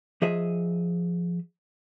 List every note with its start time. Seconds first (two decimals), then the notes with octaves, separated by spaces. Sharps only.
0.22 F3 G#4 D#5 E5